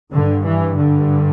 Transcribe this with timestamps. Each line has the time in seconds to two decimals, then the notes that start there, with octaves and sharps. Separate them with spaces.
0.13 G2 D3
0.45 E3
0.77 D3